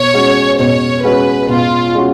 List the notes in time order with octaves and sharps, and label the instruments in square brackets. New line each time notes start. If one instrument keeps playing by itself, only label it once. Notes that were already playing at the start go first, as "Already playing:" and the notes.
Already playing: [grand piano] B2 [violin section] C#5
[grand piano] G#3 C#4 F#4
[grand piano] B2 [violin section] C#5
[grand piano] G#3 C#4 F#4 [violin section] B4
[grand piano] B2 [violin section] F4
[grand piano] G#3 C#4 F#4